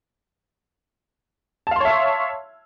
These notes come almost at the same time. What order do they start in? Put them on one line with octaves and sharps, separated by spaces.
A5 F5 C6 C#5 E5